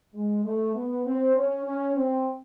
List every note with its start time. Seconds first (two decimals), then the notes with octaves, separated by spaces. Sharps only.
0.15 G#3
0.45 A3
0.76 B3
1.06 C4
1.36 C#4
1.66 C#4
1.96 C4